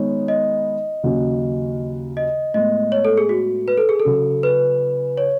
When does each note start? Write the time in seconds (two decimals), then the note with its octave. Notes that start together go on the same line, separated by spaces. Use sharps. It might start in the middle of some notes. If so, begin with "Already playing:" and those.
Already playing: D#3 G#3 B3 D#4 C#5
0.28 D#5
1.03 D#2 C#3 F#3 C#4 F#4
2.17 D#5
2.54 A2 G#3 B3 D#5
2.92 C#5
3.05 A4
3.17 G#4
3.29 F#4
3.68 B4
3.77 A4
3.89 G#4
4.00 A4
4.05 C#3 F#3 C#4
4.43 B4
5.18 C#5